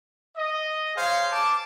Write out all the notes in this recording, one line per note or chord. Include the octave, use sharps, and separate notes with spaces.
D#5
G#4 C5 C#5 F5
A5 D6